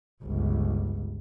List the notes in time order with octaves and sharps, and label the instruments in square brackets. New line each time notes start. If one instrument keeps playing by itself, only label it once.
[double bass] G1 C#2